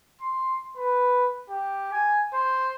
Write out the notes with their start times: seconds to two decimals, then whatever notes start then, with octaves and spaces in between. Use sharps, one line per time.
0.21 C6
0.77 B4
1.50 G4
1.92 G#5
2.34 C5